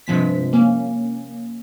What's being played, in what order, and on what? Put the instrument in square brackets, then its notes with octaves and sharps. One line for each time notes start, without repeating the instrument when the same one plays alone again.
[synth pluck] G2 C3 F3 G#3 B6
A#3 C#4